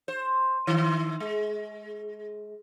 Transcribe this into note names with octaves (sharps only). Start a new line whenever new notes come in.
C5
D#3
G#3